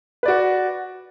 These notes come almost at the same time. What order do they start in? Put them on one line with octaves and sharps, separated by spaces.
B4 D5 F#4